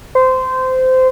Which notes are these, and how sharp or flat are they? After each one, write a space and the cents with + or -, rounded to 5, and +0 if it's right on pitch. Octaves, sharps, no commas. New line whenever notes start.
C5 -20